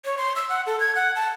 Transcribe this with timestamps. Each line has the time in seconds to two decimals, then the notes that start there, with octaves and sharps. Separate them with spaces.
0.05 C#5
0.18 C6
0.36 E6
0.50 F#5
0.66 A4
0.80 G#6
0.95 F#5
1.16 A5